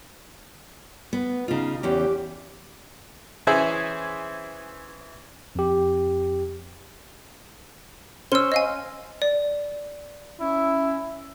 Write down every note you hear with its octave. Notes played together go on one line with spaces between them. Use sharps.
B3
C#3 D#4 F4
E2 C#4 G4
E3 C#4 E4 G#4 C5 E5
F2 G4
C#4 C5 E6 G7
D#5 F5 G#5
D5
C#4 E4